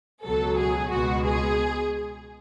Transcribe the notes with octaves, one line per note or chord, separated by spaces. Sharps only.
C#2 B2 F#3 A4
G#4
C#2 B2 G#3 F#4
G#4